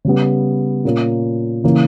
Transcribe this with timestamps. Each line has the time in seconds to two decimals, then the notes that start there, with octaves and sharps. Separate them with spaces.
0.05 C#3 G3 B3
0.85 A#2 A#3 C#4
1.64 C#3 E3 A#3